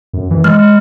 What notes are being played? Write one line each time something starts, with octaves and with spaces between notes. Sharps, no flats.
F#2
E3
G#3 F6